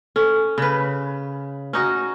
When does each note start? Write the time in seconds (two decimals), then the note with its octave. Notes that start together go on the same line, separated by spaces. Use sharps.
0.16 C#4 A4
0.58 C#3 B4
1.73 C#4 D#4 F#4